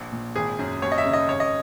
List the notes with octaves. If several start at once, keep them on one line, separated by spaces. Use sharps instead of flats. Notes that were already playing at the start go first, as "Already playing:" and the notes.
Already playing: A#1 C#5
A#2
G#1 G#4
F#2
D#2 C#5
D#5
E5
C#3
D#5
G#1 C#5
D#5